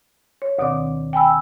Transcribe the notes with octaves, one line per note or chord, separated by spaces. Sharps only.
C#5
D2 B2 D#3 C4 D5 D6
G5 G#5 B5 E6